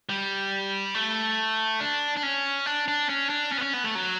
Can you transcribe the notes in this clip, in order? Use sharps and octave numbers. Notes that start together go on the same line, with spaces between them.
G3
A3
D4
D4
C#4
D4
D4
C#4
D4
C#4
B3
C#4
B3
A3
F#3